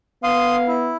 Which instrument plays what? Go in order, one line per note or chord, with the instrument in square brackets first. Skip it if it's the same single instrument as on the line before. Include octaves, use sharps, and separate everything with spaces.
[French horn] B3 [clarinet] F5 [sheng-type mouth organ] C6 D#6
[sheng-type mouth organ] E4